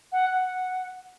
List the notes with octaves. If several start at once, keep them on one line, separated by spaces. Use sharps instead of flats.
F#5
F#5